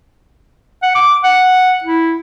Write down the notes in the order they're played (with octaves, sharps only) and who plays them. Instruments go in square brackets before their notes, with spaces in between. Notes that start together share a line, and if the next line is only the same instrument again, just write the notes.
[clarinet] F#5
D6
F#5
E4